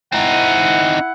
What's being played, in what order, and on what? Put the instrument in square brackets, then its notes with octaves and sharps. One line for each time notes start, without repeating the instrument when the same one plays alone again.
[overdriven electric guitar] C4 D#4 [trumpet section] E4 F#5